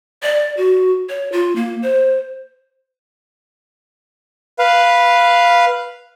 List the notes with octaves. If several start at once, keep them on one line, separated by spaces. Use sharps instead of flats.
D5
F#4
C#5
F4
A#3
C5
B4 F5